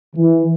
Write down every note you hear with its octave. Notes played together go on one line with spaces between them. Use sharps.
E3